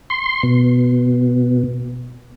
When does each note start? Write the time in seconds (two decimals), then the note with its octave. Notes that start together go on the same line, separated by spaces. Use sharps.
0.10 C6
0.43 B2